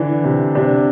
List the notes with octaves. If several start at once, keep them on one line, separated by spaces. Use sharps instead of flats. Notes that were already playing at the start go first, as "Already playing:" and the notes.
Already playing: D3 E3 D4
C3
C3 D4